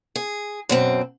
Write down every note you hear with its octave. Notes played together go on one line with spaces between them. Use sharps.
G#4
F#2 B2 C4